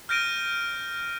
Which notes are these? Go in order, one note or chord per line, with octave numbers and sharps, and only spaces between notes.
F6 G6 A#6 D7 D#7